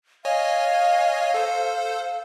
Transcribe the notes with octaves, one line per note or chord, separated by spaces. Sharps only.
C#5 D#5 F5 G#5
A4 C5